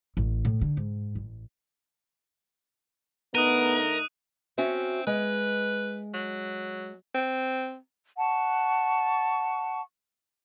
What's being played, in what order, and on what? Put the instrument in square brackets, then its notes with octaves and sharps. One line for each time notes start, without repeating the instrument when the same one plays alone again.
[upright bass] A1
A2
D3
G#2
A1
[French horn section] D3 A3 D#4 [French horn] B3 [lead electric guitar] A#4 [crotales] D#6 F#6 D#7
[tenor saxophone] C4 [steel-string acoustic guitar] C#4 F#4 E5
[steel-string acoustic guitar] G#3 [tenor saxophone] B4
[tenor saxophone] F#3
C4
[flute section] F#5 A5 C#6